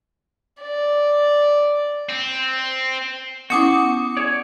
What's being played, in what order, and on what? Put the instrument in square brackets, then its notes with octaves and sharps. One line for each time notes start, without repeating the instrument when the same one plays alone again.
[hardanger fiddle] D5
[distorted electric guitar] C4
[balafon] B3 C#4 E4 [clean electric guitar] F#4 [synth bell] D6 D#6 C#7
[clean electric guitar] G#4 C#5 D5